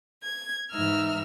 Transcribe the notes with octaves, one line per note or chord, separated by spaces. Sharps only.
G#6
G#2 E3 D#4 E5 E6 F6